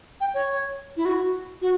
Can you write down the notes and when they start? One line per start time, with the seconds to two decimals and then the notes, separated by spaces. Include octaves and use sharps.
0.21 G5
0.34 C#5
0.97 E4
1.05 F#4
1.62 F#4